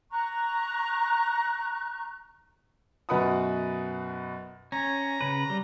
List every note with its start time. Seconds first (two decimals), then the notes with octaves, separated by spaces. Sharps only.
0.10 A#5 C#6 F#6
3.09 F#2 B2 B4 F#5 B5 D#6
4.72 C#4 A#5
5.21 C#3 B4
5.50 G3